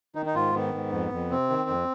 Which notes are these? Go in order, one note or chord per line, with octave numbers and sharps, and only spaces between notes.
D#3 D#4
D#4
G#2 F4
D#3 B3
G#2
F2
F2
C3 C4
D#3
F2